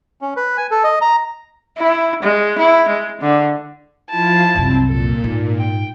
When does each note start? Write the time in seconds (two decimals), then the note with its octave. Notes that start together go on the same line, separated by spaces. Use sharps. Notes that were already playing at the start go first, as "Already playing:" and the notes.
0.21 C#4
0.37 B4
0.57 G#5
0.71 A4
0.84 D#5
1.01 A#5
1.78 E4
2.23 G#3
2.58 E4
2.89 G#3
3.21 D3
4.10 F3 E4 F4 A5
4.55 C2 F#2 C4
4.88 A#2 A4
5.24 G#2
5.58 G5